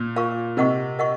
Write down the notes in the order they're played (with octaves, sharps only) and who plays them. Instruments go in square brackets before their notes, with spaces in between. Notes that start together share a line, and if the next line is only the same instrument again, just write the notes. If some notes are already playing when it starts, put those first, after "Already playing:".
Already playing: [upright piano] A#2
[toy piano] F4 A#4 F5 A#5 C#6
[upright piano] C3 [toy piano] A#4 D#5 F#5 C#6
[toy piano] A#4 D#5 F#5 C#6